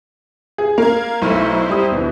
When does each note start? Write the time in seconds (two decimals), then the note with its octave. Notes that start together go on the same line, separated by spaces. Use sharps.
0.58 G#4
0.78 A#3 F5 G#6
1.22 B1 A3 D#4 E4 C5
1.70 G3 D#6
1.91 D2 B2 E3